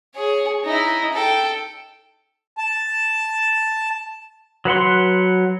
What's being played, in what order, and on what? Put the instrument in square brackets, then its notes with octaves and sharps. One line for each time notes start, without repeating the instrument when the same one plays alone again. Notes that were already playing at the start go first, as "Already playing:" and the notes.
[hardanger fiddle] G#4 C#5
D#4 E4
A4 G5
[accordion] A5
[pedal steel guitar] F#3 B4 F#5 C6